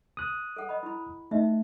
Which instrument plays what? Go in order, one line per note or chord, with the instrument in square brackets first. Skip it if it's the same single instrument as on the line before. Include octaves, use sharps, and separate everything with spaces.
[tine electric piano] D#6 F#6
[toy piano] A4 F#5
D#5 B5
E4 B5
[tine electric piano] A3 [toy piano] D#4 D#5 E5